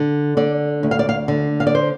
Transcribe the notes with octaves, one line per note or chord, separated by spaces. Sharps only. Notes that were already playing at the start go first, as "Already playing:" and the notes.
Already playing: D3
D3 D5
D2
F5
D5
F5
D3
F5
D5
C5